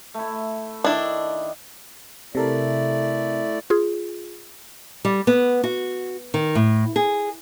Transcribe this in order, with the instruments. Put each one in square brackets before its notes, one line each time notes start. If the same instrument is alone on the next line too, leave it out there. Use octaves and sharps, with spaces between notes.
[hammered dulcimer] A3 E4
[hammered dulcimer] D#3 [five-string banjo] D4 E4
[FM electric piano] C3 A4 A#4 [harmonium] A3 E4 D5
[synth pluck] F4 G#4
[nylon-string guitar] G3
B3
F#4
D#3
A2
G#4